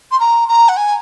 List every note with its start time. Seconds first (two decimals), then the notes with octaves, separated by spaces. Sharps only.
0.11 C6
0.20 A#5
0.48 A#5
0.68 F#5
0.77 G#5